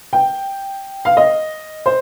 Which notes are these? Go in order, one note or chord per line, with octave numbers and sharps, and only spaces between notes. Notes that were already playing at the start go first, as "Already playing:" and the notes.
G5
F5
D#5
C5